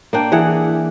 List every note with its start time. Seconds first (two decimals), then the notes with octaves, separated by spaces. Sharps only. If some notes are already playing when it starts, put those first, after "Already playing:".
0.13 A#3 D4 G5
0.32 E3 G#4 F#5